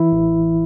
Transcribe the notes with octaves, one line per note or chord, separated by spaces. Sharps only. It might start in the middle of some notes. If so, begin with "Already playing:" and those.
Already playing: E3 E4
A1